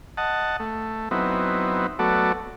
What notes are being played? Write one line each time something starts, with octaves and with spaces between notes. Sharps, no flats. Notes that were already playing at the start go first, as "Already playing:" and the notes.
D#5 F#5 A5
A3
F#3 B3 C4 D#4 E4
F#3 A3 B3 F#4 A4 D5